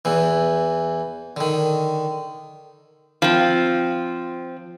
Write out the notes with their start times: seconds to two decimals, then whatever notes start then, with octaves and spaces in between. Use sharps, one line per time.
0.05 E2 E3
1.37 D3 D#3
3.22 F3 C4